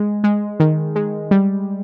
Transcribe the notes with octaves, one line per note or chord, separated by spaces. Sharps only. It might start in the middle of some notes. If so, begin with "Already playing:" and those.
Already playing: G#3
G#3
D#3
G#3
G3